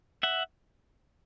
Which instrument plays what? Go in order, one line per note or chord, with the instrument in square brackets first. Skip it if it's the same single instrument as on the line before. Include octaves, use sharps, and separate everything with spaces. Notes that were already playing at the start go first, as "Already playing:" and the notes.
[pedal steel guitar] E5 F#5